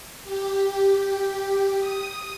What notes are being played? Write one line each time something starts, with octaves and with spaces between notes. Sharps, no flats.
G4
D#6